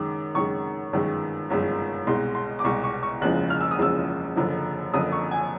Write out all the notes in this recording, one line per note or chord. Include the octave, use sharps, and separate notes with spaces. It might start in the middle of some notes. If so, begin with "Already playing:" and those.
Already playing: F#2 D#3 G#3 D6
F#2 D#3 G#3 C#6
G1 F#2 D#3 G#3
G1 F#2 D#3 G#3
C2 B2 G#3 C6
C6
D6
C2 B2 G#3 C#6
C#6
C#6
F#1 E2 C#3 F3 G#3 F#6
F6
E6
D#6
F#1 E2 C#3 F3 G#3 E6
F#1 F#2 D3 F3
F#1 F#2 D3 F3 D#6
C#6
G#5